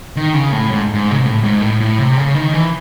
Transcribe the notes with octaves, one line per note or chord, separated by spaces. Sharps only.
D#3
C#3
A2
G#2
G#2
C#3
C3
A2
G#2
A2
A2
C3
C#3
D#3
E3